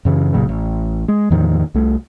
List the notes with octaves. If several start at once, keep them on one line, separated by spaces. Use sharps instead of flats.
F#2 C#3 E3
F1 A#2 C#3 F#3
A1
G#3
E2 A2 D#3 F3
C2 A3